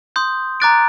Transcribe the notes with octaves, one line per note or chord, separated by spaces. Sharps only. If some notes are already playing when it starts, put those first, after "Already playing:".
C6 D#6 G6
A#5 D6 F#6 A6 D7